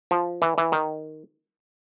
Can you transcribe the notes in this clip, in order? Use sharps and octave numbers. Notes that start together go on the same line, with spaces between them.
F3
E3
E3
D#3